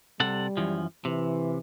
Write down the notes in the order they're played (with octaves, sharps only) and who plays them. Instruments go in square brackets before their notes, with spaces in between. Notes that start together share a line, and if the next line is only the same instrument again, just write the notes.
[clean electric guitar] C3 A4 F#5 [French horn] G3
[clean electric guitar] F#2 E3 F3
[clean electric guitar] C3 [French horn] E3